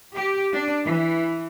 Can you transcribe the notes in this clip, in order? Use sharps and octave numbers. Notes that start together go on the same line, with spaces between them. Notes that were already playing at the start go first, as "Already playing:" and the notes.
G4
D4
E3